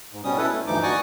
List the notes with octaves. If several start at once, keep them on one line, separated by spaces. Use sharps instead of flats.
G#2
B2 G3 C#4 D#6
E4 A4 B4
A3
D2 G2 E3 F3 D#4 D6
F#4 D5 G#5 C#6 D#6